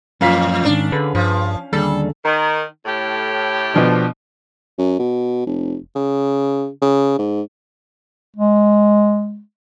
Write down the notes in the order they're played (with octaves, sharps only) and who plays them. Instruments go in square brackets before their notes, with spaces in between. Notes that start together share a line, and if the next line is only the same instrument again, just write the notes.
[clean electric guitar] F#2 F3 [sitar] A2 [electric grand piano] C#4 F5 B6
[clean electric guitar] G#2 D#3 [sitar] D4
[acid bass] D3 [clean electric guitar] G#4 B4
[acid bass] G2 [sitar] F3
[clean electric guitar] D#2 D3 G#4 [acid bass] G3 [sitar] A4
[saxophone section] D#3
A2 G4
[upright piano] B2 F3 D4
[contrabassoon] F#2
B2
F1
C#3
C#3
G#2
[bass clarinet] G#3